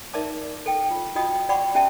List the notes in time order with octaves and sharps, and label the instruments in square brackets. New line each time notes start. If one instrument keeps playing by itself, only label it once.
[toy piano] D#4 A#4 D5 E5 A5 D6
A4 G5
F4
F4 F#4 D#5 G5 D#6
D5 F#5 G5 B5 C#6 D6
C#4 G4 E5 G5 A5